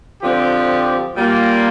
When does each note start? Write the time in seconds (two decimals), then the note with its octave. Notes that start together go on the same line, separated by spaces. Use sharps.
0.23 D3 F3 C4 G4
1.15 A#2 G3 A#3 F4 A#4